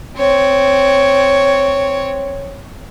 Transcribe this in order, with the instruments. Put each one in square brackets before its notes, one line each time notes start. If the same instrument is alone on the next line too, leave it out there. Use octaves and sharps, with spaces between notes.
[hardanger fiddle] C4 C#5